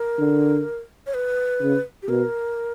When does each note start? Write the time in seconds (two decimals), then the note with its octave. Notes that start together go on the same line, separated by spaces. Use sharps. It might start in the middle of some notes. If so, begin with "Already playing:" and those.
Already playing: A#4
0.19 D3
1.07 C#5
1.14 B4
1.61 C#3
2.02 G4
2.08 B2 A#4